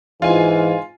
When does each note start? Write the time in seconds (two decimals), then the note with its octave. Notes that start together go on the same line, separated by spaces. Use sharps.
0.22 G#2 E3 F4 G#5